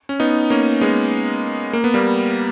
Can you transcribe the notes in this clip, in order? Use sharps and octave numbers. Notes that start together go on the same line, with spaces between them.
C#4
B3 D#4
A#3 C#4
G#3 B3
A#3
B3
G3 A#3